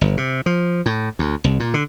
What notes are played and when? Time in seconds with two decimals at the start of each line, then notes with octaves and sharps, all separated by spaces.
0.01 G1
0.17 C3
0.46 F3
0.86 A2
1.19 D2
1.44 C2
1.60 A#2
1.74 D3